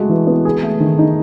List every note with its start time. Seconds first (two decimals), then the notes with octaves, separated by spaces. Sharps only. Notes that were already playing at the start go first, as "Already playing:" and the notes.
Already playing: G#3 A3 F#4
0.09 E3
0.27 B3
0.45 G#4
0.63 A3
0.80 D#3
0.99 D#4